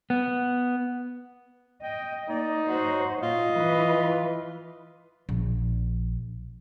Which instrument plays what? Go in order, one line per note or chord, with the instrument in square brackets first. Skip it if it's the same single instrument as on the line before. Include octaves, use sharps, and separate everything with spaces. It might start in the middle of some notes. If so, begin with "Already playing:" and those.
[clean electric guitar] B3
[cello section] D#5 [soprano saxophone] G5
[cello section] A#3 [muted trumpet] D#4 [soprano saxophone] D5
[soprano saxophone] F#4 [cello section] C5 C#5 D#5
[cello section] A#2 [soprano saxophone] F4 [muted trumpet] D#5
[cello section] E3 B4
[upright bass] A#1